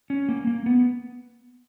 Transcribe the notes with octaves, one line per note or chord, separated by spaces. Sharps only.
C#4
A#3
A#3
B3